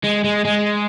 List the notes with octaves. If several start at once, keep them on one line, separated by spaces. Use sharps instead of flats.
G#3
G#3
G#3